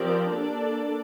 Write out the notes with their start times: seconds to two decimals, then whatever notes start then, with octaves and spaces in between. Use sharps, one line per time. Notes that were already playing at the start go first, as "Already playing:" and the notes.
Already playing: F3 C4 G4 A#4 D5
0.29 A#3 D4 A4 D5